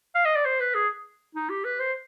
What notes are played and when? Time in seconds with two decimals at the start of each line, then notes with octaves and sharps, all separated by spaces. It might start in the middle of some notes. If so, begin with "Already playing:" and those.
0.15 F5
0.25 D#5
0.36 D5
0.45 C5
0.60 B4
0.75 G#4
1.35 D#4
1.49 G4
1.65 B4
1.80 C5